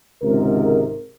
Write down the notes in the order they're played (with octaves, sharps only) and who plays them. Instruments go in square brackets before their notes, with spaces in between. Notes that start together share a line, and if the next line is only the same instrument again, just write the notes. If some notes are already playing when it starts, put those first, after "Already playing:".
[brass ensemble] G#1 C#2 G#2 C3 A#4